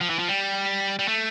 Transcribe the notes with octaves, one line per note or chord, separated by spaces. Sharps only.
F3
E3
F3
G3
G3
A3